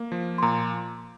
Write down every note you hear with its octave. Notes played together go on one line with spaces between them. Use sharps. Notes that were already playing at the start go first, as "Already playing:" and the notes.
Already playing: A#3
F3
C6
A#2 A#5